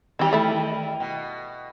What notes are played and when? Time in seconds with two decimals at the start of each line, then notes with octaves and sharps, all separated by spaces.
0.19 D#3 E3 G3 C4 G4
0.33 A3 E4
1.00 B2